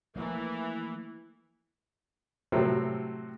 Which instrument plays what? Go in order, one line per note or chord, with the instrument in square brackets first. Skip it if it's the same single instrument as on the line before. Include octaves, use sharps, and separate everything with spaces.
[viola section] E3 [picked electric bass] F3 A3 A#3
[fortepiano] A2 C3 F#3 C4 A4